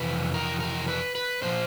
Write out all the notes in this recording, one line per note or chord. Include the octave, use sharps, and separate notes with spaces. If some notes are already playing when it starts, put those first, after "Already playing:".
Already playing: F2 C3 E3 B4
A#4
A#4
B4
B4
A#2 F3 C5